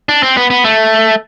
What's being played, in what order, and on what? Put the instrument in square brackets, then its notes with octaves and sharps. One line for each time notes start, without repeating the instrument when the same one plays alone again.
[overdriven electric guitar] D4
C4
B3
B3
A3